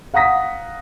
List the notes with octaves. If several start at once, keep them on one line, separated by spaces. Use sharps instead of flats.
F5 F#5 A#5 D#6 A#6 B6